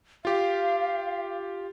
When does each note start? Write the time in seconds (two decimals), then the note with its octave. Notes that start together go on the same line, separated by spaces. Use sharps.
0.25 F4 G4 F5